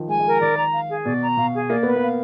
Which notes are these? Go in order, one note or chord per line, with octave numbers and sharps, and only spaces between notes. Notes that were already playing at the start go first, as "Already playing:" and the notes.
Already playing: D#3 F3
G#3 G#5
G#3
A#4
D#3 D5
A#5
F5
G#4
B2 D5
A#5
B2 F5
G#4
A#3 D5
B3 B4
A#3
F5